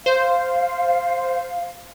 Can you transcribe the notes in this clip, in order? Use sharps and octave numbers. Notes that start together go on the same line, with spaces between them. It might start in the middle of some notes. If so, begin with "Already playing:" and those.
C5 F5